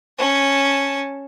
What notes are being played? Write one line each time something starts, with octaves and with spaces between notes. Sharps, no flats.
C#4 A5